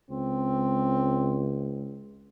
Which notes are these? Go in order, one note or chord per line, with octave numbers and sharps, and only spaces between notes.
C#2 C4